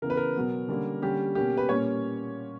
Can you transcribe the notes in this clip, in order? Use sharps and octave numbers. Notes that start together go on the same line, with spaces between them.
C#3 E3 B3 A#4
B4
A#4
B2 F#3 B3
D3 G3 A#3 C#4
D3 G3 A#3 C#4 G4
B2 A#3 C#4 G4
B4
A#2 G3 A#3 C#4 C#5